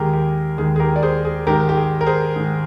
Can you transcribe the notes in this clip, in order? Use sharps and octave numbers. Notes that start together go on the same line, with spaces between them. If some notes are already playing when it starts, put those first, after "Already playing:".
Already playing: D#2 D#3 G#3 G4 G#4 A#4
G4
D#2 D#3 G#3 G#4
G#4
G4 A#4
D5
G#4 C5
G#4
G#2 D#3 G#3 G4 A#4
G4
G#4
A#4
G#4 C5
G#2 D#3 G#3